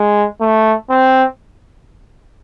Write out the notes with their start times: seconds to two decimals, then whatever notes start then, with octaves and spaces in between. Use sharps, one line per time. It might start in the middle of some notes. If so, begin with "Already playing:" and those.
Already playing: G#3
0.41 A3
0.90 C4